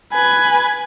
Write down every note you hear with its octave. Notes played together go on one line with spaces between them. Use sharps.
B4 G#5